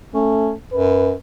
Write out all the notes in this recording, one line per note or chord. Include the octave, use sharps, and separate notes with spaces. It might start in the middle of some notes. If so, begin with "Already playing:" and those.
A3 C#4
F#2 B4